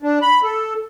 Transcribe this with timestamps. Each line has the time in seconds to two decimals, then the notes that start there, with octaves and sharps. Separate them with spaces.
0.03 D4
0.22 B5
0.44 A4